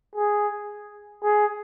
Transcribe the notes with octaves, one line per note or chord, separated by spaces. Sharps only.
G#4
G#4